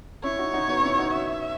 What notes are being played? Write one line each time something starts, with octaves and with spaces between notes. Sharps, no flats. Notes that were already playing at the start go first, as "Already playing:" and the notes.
C#4 E4 C#5
D#4 F#4
D#4 F#4
B3 D#4
C#4 E4
D#4 F#4
E5